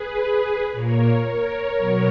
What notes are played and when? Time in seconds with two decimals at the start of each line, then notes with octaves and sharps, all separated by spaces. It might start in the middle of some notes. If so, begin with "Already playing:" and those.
Already playing: G#4 B4
0.72 A#2 A#3 A#4 C#5
1.24 A#4 C#5
1.75 B2 F#3 B3